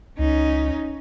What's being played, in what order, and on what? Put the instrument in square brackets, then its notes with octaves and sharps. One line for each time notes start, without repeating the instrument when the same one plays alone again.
[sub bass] C#2 [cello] C#4 D#4